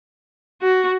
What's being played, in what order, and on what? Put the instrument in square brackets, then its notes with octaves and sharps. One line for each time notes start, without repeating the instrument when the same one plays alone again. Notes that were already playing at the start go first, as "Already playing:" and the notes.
[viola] F#4